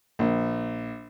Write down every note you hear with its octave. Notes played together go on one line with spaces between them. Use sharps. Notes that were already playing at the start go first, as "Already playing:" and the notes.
A#1